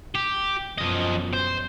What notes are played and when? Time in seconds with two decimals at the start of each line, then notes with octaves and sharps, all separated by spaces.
0.15 G4
0.78 F#2 B2 F3 D#5
1.33 C5